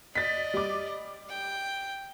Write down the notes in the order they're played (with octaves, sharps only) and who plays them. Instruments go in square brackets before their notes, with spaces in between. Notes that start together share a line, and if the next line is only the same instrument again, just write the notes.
[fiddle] D5 D#5 [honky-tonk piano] A6 B6
[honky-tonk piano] G3 D6
[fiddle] G5